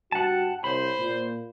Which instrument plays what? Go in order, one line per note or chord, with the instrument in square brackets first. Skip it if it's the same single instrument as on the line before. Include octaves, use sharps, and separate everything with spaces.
[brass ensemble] G2 F#4 G5 [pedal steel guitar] F#5 A5
[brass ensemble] C2 C#5 [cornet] C5 [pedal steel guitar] B5
[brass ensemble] A#2